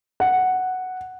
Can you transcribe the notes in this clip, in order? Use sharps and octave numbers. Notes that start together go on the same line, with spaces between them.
F#5